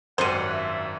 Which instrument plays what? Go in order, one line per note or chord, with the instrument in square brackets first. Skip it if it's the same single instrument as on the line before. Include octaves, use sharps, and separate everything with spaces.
[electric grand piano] G#1 F#2 D#7 [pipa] G3 C5 [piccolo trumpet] F#5
[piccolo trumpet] E5